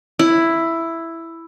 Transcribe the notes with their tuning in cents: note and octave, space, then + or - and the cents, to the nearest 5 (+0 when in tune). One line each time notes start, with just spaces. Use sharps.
E4 +5